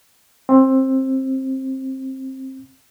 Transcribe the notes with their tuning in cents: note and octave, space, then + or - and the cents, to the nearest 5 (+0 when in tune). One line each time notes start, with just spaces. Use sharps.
C4 +20